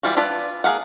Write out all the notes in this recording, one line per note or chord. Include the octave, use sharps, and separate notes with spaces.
E3 G3 F4 F#4
D4 E4 F4 B4 D5
A#3 G#4 B4 F5 F#5